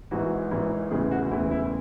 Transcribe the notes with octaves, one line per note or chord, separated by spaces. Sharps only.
G#1 G#2 E3 F#4
G#1 G#2 E3
E1 D2 C#3 E3 G#4
F#4
E1 D2 C#3 E3 E4
E4